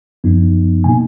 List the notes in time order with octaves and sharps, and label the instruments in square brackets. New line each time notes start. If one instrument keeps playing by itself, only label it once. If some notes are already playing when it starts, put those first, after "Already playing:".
[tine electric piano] F#2 F3 B3 D#4
B2 A#3 D#4 G#5